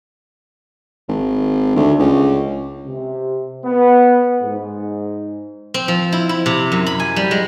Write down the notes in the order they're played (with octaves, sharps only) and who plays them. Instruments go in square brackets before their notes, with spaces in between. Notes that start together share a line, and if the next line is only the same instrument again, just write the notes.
[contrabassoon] G#1
D2
C#2
[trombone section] C3
B3
G#2
[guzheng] C4
F3
E4
E4
C3
F#2
B5
G#5
G3
G#3